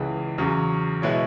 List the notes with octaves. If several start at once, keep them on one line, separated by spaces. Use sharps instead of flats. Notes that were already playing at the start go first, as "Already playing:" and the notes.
Already playing: C#2 C#3 E3
E2 C#3 F#3 C#4
B2 G#3 E4 C#5